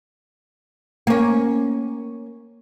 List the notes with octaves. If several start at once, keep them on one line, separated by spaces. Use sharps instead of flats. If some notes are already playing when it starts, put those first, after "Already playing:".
A#3 C#4